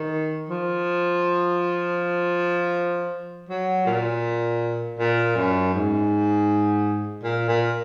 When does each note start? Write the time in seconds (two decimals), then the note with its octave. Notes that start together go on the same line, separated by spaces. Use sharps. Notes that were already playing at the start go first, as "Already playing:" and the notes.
Already playing: D#3
0.49 F3
3.49 F#3
3.86 A#2
4.99 A#2
5.36 F#2
5.74 G#2
7.23 A#2
7.48 A#2